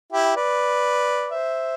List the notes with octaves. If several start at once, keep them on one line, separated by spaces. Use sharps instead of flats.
E4 G4
B4 D5
C5 E5